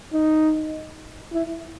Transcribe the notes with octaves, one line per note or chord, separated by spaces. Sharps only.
D#4
E4